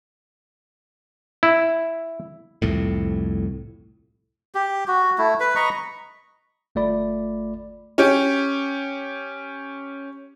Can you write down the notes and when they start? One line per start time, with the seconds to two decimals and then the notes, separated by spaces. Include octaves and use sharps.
1.43 E4
2.62 C2 F2 A2
4.55 G4
4.88 F#4
5.18 A3 E4
5.40 B4 B5
5.55 D#5 A#5 B5 C#6
6.75 G1 A3 F4 D5 B5
7.98 C#4 G4